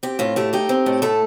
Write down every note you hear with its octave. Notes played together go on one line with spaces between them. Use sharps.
C4 G4
A2 F4
A3 G4
D#4 G4
C4
A2
A3 A4